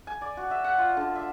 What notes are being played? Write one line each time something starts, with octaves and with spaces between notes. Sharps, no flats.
G#5
D5
F#4
E5
F#5
F4
D3
E5